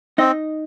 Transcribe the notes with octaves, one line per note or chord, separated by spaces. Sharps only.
C4 D#4 D#5